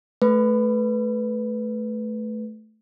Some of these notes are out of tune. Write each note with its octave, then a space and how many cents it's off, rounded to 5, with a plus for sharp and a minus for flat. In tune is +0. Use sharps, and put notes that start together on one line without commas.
A3 -15 B4 +0